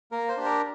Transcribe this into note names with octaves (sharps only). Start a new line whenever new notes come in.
A#3 A#4
C5
D4 G4
A#4